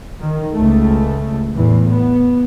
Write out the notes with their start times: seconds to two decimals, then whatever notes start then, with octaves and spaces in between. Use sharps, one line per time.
0.20 D#3
0.54 C#2 A3
1.55 E2 A2 E3
1.93 B3